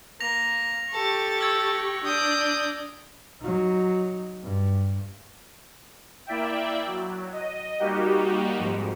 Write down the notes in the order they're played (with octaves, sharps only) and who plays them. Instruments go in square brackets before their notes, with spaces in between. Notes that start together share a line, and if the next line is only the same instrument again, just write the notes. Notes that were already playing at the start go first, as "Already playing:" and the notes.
[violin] A#3 [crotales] A#6 F7
[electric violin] G4 C#6 [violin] A4 A6
[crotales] E6 G#6
[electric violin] D4 D5 [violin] D#6 G6
[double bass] F#3 D#4
G2
[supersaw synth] A#3 E4 D5 E5 G5
F#3
D#5
G3 A#3 D#4 F#4 G4
F2 G#2